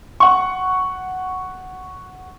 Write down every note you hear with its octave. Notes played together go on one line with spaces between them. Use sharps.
F#5 C#6